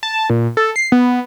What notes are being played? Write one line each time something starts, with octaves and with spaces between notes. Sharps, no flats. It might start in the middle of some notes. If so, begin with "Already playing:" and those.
A5
A#2
A4
C7
B3